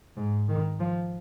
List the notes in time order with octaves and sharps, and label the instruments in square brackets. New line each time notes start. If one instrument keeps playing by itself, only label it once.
[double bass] G#2
D#3
F3